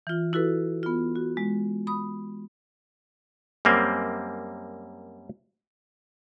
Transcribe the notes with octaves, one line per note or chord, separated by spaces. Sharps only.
E3 F4
E4 F#4 A4 B4
B3 F4
F#4
G#3
B5 D#6
F#2 G3 A#3 C4